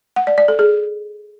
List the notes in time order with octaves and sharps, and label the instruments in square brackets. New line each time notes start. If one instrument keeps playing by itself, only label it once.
[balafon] F#5
D5
D5
A4
G#4